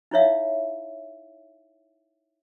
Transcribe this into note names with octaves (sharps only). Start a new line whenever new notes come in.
D#4 E4 C#5 E5 F5